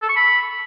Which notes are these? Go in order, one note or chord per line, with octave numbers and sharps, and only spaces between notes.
A4
C#6
B5